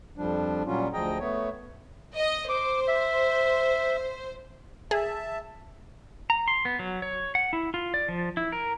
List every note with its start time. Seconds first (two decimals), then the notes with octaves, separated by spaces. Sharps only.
0.17 F2 F3 G3 D4
0.66 A#2 F#3 G3 C#4 F4
0.93 D2 F3 G#4 D#5 G5 A#5
1.19 A3 B3 C#5
2.16 D#5
2.49 C5 D6
2.88 E5
4.91 G#4 E5 A5
6.30 A#5
6.48 C6
6.65 B3
6.79 F#3
7.02 C#5
7.35 F#5
7.53 E4
7.74 F4
7.94 D5
8.09 F3
8.37 E4
8.52 A#4